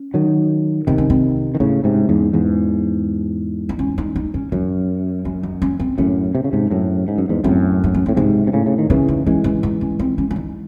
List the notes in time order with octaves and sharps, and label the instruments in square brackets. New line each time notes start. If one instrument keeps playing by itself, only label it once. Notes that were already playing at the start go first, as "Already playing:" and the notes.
Already playing: [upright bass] C#4
[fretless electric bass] D#3 F#3
[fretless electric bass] C3 D#3 [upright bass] C4
[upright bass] C#4
C4
[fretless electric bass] D#3
[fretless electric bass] A2 C#3 [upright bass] C#4
[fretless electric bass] G#2 C3
E2 G#2
E2 G#2
[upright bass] D#4
C#4
D#4
D#4
C#4
[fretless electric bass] F#2 [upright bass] C#4
[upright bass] C#4
D#4
C#4
C4
[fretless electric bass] F#2 A2 [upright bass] C#4
[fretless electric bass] C3
C#3
G#2 C3
F#2 A2
G#2
F#2
E2 G#2
[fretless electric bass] F#2 A2 [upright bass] C4
[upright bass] D#4
C#4
[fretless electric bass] A2 [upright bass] C4
[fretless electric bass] G#2 C3 [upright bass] A3
[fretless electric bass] C3
A2 C#3
C#3
D#3
[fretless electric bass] C#3 E3 [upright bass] C#4
[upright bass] D#4
[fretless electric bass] E3 G#3 [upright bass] C#4
[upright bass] C#4
D#4
C#4
C4
C#4
C#4
D#4